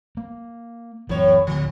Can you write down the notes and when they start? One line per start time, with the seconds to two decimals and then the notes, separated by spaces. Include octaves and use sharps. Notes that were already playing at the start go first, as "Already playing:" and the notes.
0.17 A#3
1.09 F#2 A2 E3 F#3 C#5
1.47 D1 D3 F3